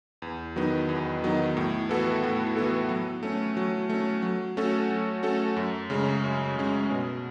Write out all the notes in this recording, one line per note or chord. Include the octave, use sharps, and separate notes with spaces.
E2
D#3 F#3 B3 D#4
E2
D#3 F#3 B3 D#4
A2
E3 B3 F#4 A4
A2
E3 B3 F#4 A4
F#3
A3 C#4
F#3
A3 C#4
F#3
A3 C#4 F#4 A4
F#3
A3 C#4 F#4 A4
F#2
C#3 G#3 C#4
F#2
C#3 G#3 C#4
B2